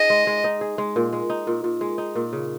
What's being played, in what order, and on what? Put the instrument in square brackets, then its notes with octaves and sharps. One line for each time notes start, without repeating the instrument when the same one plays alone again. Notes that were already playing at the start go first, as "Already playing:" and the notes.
Already playing: [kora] D#4 G#4 [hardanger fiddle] D#5
[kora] G#3
G#3
D#4
G#4
G#3
A#2
G#3
D#4
A#2
A#2
G#3
D#4
A#2
C#3